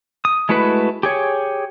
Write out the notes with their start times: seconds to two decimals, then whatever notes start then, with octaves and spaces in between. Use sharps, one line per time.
0.25 D#6
0.49 G#3 A3 E4 F#4 B4
1.03 G4 G#4 C#5